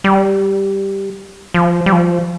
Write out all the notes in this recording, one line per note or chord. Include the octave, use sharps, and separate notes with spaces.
G3
F3
G3
F3